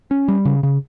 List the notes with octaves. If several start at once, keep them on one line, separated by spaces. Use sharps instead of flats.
C#4
G3
C#3
C#3